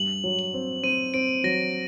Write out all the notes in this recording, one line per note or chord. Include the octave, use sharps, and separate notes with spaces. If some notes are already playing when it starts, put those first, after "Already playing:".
Already playing: G2 F#7
F#3
F#7
C4
C4 D#7
C4 D7
F#3 A#6